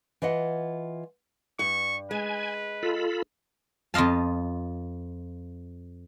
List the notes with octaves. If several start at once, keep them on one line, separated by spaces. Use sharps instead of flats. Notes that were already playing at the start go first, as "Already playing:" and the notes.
E3 F4 D#5 F#5
G2 C#6
G#3 B4 G#5
F4 A4 B5
F2 F4 D#5 F5 A5